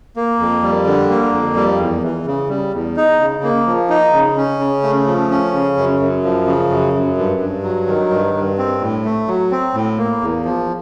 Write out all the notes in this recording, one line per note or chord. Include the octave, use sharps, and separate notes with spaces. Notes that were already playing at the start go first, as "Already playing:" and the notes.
A#3
F2
G3
D3
A#3
F2
G3
E2
E3
C#3
G3
E2
D#4
C#3
A#3
F3
D#4
C#3
C#4
C#3
A3
F3
C#4
C#3
F#2
F#2
F3
C#3
F#2
F#2
G2
G2
F#3
D#3
G2
G2
C4
A2
A3
F#3
C4
A2
A#3
E2
F3